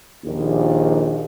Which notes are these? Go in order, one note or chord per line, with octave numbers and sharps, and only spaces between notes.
A#1 D#2